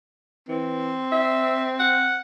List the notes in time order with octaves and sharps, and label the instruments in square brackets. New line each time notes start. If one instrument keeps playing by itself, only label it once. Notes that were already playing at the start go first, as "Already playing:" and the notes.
[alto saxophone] E3 [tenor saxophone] C4
[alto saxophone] E5
F#5